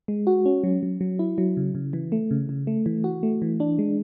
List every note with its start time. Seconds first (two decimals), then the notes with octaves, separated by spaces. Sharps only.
0.08 G#3
0.27 F#4
0.46 C#4
0.64 F#3
0.83 F#3
1.01 F#3
1.19 E4
1.38 F#3
1.57 C#3
1.75 C#3
1.93 E3
2.12 A3
2.31 C#3
2.49 C#3
2.67 A3
2.86 E3
3.04 F#4
3.23 A3
3.42 E3
3.60 D4
3.79 G#3